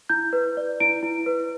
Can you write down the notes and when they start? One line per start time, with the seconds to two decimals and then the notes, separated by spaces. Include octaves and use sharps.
0.09 E4 G6
0.33 B4
0.57 D5
0.80 E4 D7
1.03 E4
1.26 B4